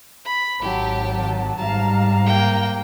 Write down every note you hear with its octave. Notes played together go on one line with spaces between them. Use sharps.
B5
G#1 F#3 G4 A5
G#2 G3 F5 A5 A#5
A#3 G5